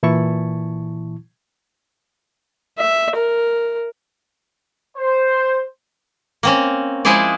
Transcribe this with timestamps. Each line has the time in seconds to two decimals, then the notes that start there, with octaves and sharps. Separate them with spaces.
0.03 A#2 E3 E4 A5 C#6
2.78 E5
3.16 A#4
4.97 C5
6.43 A#3 C4 C#4
7.05 F3 G#3 E4 G#4 C5 D5